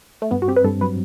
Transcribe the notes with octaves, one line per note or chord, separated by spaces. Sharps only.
A3
G2 B3
F#4
C4 G4
B4
G2 A4
F#3 B4